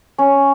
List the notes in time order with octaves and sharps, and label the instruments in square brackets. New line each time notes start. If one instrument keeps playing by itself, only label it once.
[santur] C#4